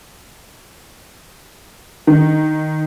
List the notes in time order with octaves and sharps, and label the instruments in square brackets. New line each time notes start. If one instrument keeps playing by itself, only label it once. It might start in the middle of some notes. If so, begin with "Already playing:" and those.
[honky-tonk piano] D#3